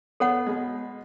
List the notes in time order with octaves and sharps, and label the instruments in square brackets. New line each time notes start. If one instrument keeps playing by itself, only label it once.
[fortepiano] B3 [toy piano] A4 C#5 F#5
[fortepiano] B2 G#3